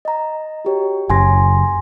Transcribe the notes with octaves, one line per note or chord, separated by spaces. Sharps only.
D#5 A#5
F#4 G4 C#5
F#1 G#5 C6 A#6